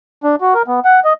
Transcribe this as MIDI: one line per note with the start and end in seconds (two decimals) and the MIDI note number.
0.24 0.36 62
0.41 0.54 66
0.54 0.62 70
0.68 0.80 59
0.85 1.00 78
1.05 1.13 75